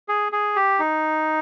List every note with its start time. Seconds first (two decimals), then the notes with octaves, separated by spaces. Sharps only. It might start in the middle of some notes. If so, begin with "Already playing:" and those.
0.08 G#4
0.32 G#4
0.56 G4
0.79 D#4